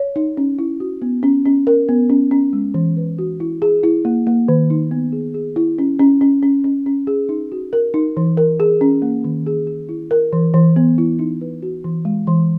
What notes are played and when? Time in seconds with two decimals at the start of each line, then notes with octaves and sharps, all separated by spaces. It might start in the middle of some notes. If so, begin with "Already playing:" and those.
Already playing: C#5
0.16 D#4
0.37 C#4
0.59 E4
0.80 F#4
1.02 B3
1.23 C#4
1.45 C#4
1.67 A#4
1.89 B3
2.10 C#4
2.31 C#4
2.53 G#3
2.74 E3
2.97 B4
3.19 F#4
3.40 E4
3.62 G#4
3.84 E4
4.05 A#3
4.27 A#3
4.48 D#3
4.70 D#4
4.91 B3
5.12 G#4
5.34 G#4
5.56 E4
5.79 C#4
5.99 C#4
6.21 C#4
6.43 C#4
6.64 C#4
6.86 C#4
7.07 G#4
7.29 D#4
7.52 F#4
7.73 A#4
7.94 D#4
8.17 E3
8.37 A#4
8.60 G#4
8.81 C#4
9.02 A#3
9.24 D#3
9.47 G#4
9.67 G#4
9.89 E4
10.11 A#4
10.33 E3
10.54 E3
10.76 B3
10.98 E4
11.19 D#4
11.41 B4
11.62 F#4
11.84 E3
12.05 G#3
12.27 E3